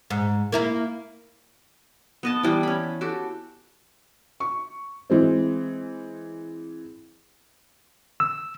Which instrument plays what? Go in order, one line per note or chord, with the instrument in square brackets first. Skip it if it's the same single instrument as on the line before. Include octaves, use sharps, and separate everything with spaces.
[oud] G#2
A#3 E4 A#4
[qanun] B3 D#5 A5
E3 G3
C#4 B5
F#4 G4 A4
[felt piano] C#6
E3 G#3 C4
[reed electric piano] E6